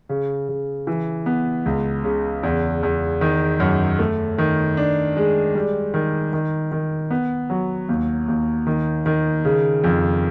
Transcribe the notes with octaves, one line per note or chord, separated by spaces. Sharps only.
C#3
C#3
E3
B3
C#2
C#3
E2
E2
D#3
F#2
A3
D#3
D4
G#3
G3
D#3
D#3
D#3
B3
F#3
D#2
D#2
D#3
D#3
C#3
F2